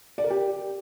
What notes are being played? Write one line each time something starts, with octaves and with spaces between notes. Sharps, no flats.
D5
A#4
G4